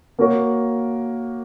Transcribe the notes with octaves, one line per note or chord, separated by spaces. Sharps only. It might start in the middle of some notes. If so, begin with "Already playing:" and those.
A#3 F#4 A#4 C#5